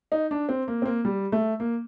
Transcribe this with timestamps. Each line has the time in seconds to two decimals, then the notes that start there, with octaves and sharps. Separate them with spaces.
0.12 D#4
0.31 D4
0.49 C4
0.68 A#3
0.82 C4
0.86 A#3
1.05 G3
1.32 A3
1.60 A#3